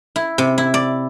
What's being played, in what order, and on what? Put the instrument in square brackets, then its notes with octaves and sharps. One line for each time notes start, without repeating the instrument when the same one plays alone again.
[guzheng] E4
C3
E4
D5